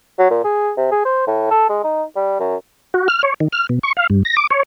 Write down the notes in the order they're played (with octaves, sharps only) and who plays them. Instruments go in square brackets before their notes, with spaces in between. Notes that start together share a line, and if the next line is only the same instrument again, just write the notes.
[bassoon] F#3
A#2
G#4
C3
G#4
C5
A2
A4
G#3
D#4
G3
F#2
[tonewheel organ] F#4
F6
C#5
D#3
F6
B2
C#6
F5
G2
A#6
D6
C#5